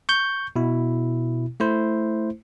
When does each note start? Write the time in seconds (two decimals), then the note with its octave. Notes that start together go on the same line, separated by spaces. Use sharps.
0.09 C#6 G6
0.56 B2 E4
1.60 A3 E4 C5